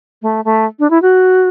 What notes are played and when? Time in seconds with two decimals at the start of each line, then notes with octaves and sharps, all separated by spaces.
0.22 A3
0.45 A3
0.79 D4
0.90 E4
1.02 F#4